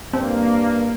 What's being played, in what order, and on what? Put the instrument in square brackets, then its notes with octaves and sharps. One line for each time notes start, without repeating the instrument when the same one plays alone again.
[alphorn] G2 [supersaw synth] A#3 [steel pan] C4